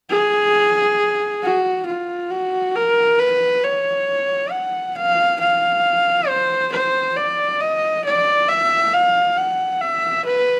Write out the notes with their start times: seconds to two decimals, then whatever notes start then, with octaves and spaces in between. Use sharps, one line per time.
0.10 G#4
1.42 F#4
1.86 F4
2.31 F#4
2.76 A#4
3.19 B4
3.63 C#5
4.51 F#5
4.96 F5
5.40 F5
6.28 C5
6.72 C5
7.17 D5
7.60 D#5
8.05 D5
8.49 E5
8.93 F5
9.37 F#5
9.81 E5
10.25 B4